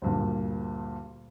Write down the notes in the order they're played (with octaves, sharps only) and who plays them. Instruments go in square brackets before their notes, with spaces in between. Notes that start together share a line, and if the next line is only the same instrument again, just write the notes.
[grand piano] D2 G2 A#2